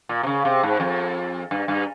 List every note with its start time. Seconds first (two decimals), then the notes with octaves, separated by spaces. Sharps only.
0.09 A#2
0.23 C3
0.27 C#3
0.45 C3
0.63 G#2
0.80 F2
1.51 G2
1.68 G2